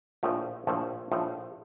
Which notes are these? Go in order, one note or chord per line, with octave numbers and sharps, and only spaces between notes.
A#1 A2 F3 A3
A#1 A2 F3 A3
A#1 A2 F3 A3